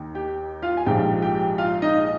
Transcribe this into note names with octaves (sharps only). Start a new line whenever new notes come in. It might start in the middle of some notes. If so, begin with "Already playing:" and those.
Already playing: D#2 D#3
G4 G5
F4 F5
G#5
A#1 G#2 F3 G4 G5
G4 G5
F4 F5
D#4 D#5